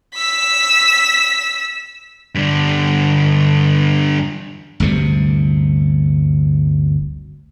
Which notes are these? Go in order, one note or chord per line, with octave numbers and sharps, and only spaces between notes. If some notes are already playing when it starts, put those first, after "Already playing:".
E6 B6
G2 D3
G1 D2 C3 G3